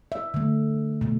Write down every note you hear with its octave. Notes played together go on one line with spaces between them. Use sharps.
E5
D3 A3
B2 A3